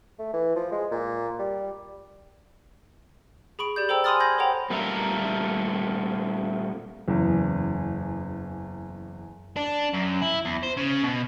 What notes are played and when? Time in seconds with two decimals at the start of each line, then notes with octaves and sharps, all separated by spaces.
0.19 A3
0.33 E3
0.55 F3
0.72 G#3
0.91 A#2
1.39 G3
3.59 G#4 B5 C#6 D7
3.76 G4 D5 G6
3.89 A4 C5 G5 A#5 E6
4.04 G#5 B5 C6 D#6 F6 A6
4.20 B5 G6 G#6 A#6
4.38 A4 C5 C#5 F#5 G5 A#5
4.70 A#2 G3 A3 A#4 E5 A#5
7.08 F#1 E2
9.56 D4
9.93 F#2
10.22 E4
10.45 E2
10.63 C5
10.77 C#3
11.04 B2